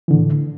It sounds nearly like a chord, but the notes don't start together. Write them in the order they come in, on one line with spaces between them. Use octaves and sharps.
E3 D3 A2